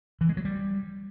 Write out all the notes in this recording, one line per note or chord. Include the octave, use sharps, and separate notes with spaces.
E3
G#3
F#3
G3